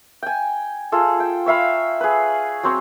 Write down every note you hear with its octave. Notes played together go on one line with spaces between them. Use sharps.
G5 G#5
F4 G#4 A4
G5
C#5 E5 F5 B5
G#4 B4
F#3 C4 C#5